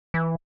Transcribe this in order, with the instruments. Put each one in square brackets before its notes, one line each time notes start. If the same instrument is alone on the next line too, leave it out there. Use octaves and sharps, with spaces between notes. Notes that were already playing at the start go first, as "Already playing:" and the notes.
[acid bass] E3